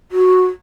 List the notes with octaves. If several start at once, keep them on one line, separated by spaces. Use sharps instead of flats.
F#4